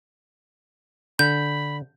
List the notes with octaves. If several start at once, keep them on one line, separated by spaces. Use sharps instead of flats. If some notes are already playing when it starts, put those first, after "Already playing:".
D3 B5 G6